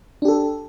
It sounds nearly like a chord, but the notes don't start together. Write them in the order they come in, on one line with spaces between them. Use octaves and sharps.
D4 G4 A4